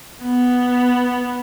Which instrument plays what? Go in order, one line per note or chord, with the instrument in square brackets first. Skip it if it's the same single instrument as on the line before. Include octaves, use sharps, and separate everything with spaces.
[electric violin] B3